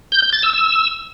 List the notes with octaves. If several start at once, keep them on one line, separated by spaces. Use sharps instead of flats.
G6
G6
A6
E6
E6